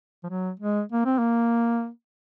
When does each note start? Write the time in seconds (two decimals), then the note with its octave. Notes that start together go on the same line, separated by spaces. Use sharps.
0.24 F3
0.29 F#3
0.60 G#3
0.92 A#3
1.05 C4
1.18 A#3